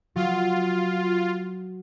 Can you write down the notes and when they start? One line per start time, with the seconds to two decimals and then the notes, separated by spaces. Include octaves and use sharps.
0.16 F#3 F4